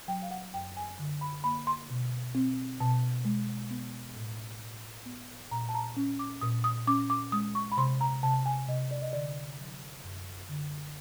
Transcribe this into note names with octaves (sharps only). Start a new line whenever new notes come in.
F#3 G5
F5
F#5
F#2 G5
G#5
D3
B5
A#3 B5
C6
B2
C4
B2 A5
G#3
B3
A2
A2
B3
A#2 A#5
A5
A#5
C#4
D6
A#2 D#6
D#6
C#4 D6
D6
G#3 D#6
C#6
B5
C3 C6
A#5
C3 A5
G#5
C3 D#5
D5
D#5
D3 D5
F#3
F#2
D3